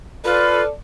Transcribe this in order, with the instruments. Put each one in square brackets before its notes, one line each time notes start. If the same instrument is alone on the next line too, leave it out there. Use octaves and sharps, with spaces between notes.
[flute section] F4 F6 [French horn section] A4 D5 [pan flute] B4 [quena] B5